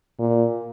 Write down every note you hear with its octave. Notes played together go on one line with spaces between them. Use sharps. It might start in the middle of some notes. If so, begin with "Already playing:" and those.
A#2